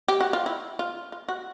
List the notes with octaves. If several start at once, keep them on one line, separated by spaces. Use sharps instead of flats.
G4
F#4
F4
E4
F4
F4
F#4